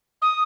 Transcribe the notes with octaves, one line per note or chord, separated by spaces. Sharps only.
D#6